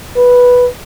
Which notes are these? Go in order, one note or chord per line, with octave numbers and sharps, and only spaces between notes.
B4